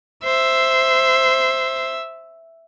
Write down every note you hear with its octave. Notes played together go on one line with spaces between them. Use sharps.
C5 E5